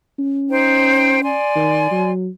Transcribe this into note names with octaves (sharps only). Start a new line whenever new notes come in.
C#4
D#4 C5 G5
D5 G#5 C6
D#3
F#3